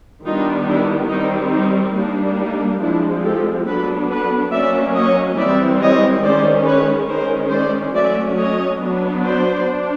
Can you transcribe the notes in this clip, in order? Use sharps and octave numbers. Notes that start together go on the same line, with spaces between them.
D#3 G3 B3 D4 D#4 F4
D4 E4
D#3 G3 C4 D#4
D#4
G3 A#3 D4 D#4
D#4
F3 G#3 C4 D4 E4
G4 A4
F#3 B3 D4 A4 B4
A4 B4
F#3 A#3 C#4 D5 E5
C#5 D#5
E3 G3 C4 D5 E5
C#5 D#5
D#3 G#3 C#4 C5 D5
B4 C#5
D#3 G#3 C#4 A#4 C5
C5 D5
F#3 A3 C#4 D5 E5
C#5 D#5
F#3 B3 D4
C5 D5
D4